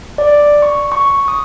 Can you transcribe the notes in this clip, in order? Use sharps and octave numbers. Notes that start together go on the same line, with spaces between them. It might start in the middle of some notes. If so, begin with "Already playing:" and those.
D5
C#6
C#6
D#6